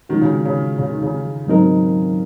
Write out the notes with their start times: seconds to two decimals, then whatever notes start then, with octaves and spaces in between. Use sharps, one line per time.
0.09 D#3 F3 G#3 C#4 F#4
0.21 C#3
0.45 C#3
0.78 C#3
0.91 D#3
1.03 C#3
1.47 G#2 F#3 C4 D#4 A#4